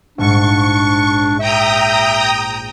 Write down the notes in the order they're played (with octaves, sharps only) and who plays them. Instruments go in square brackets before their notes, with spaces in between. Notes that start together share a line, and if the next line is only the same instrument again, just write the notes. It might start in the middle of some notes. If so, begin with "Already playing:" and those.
[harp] A#1 G#2 [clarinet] D4 [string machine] C#6
[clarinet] E5 [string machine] G5 A#5 D#6